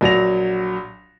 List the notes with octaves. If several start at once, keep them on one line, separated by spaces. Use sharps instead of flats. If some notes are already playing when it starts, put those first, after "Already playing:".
A#1 F#3 A#6 F7